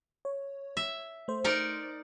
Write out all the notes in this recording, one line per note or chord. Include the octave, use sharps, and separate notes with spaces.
C#5
E5
A3 C5
D#4 A#4 D5